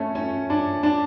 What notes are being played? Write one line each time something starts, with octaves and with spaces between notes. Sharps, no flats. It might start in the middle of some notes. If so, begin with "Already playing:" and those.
Already playing: A3 C#4
C#4
D4
D4